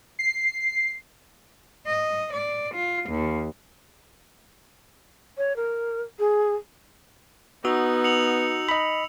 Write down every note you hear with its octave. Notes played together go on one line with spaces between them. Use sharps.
C7
D#5
D5
F4
D#2
C#5
A#4
G#4
B3 D#4 F#4 E6
C#7 F7 F#7
D#5 B5